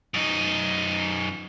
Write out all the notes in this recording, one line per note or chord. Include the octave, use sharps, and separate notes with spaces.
F#2 D#4